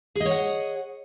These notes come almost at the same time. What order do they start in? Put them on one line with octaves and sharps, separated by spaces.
G#4 D#5 C#5 F#5